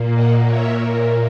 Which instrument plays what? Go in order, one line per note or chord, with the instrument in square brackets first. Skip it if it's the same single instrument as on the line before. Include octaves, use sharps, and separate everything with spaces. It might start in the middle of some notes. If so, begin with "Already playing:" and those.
Already playing: [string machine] A#2 A#3
D#5 F#5
C#5 E5